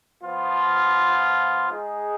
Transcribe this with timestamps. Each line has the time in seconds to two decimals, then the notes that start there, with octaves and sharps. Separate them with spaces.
0.24 F3 B3 F4
1.70 G#3 D#4 G#4